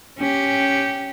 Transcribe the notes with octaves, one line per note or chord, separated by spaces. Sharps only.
C#4 G4